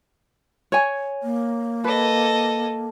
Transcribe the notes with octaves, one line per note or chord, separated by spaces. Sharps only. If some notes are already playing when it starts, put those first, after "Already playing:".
C#5 G#5
A#3
A4 B4 D#5